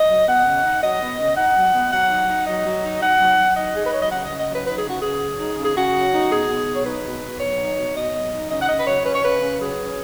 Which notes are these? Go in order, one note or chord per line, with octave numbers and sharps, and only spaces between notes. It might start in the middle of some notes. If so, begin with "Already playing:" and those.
Already playing: D#5
F#3
B3 F#5
C#3
D#4
F#3 D#5
B3
C#3
D#4 F#5
F#3
B3
F#3 F#5
D#4
D#4
F#3 D#5
F#3
D#4
D#4 F#5
F#3
F#3
D#4 D#5
D#4 G#4
B4
F#3 C#5
D#5
C#3 F#5
C#3 D#5
D#5
F#3 B4
D#4 B4
G#4
C#3
F#4
C#3 G#4
F#3
D#4
C#3
G#4
C#3 F#4
F#3
D#4
B2 G#4
B2
F#3
C#5
D#4 B4
B2
B2
F#3 C#5
D#4
B2
B2 D#5
F#3
D#4
C#3 D#5
F#5
C#3 D#5
B4
F#3 C#5
C#4 B4
C#5
C#3 B4
C#3
F#3 G#4
C#4